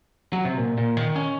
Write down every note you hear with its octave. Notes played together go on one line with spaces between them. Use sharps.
F#3
C3
A#2
A#2
D#3
C#4